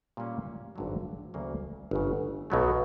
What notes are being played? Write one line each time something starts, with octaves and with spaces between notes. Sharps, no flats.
A#2 G3 A#3 C#4
G#1 G2 D3 F#3
D2 C#3 F#3 A#3
G1 F#2 C#3
B1 B2 F#3 A3